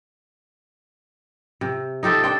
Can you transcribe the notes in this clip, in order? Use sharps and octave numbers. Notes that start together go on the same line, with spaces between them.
C3
D#4 G4 A4 C5
D4 A4 C5 G5